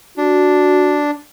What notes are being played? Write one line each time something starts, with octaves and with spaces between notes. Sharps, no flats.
D4 F#4